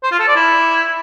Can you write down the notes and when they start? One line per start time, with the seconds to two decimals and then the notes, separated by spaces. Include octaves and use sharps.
0.03 C5
0.11 F4
0.19 A4
0.27 D5
0.36 E4